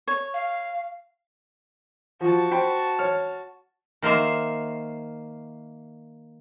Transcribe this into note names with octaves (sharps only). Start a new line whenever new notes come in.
C#5
F5
F3 F#4 A5
C5 G5 B5
C#5 F6
D#3 A#3 C5 E5